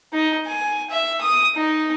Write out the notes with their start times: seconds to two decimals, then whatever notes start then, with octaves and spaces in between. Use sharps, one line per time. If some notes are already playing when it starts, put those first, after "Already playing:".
0.13 D#4
0.47 G#5
0.91 E5
1.21 D#6
1.55 D#4